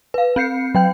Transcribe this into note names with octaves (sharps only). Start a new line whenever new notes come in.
B4 F5
C4 G6 C7 C#7
F#3 G5 G6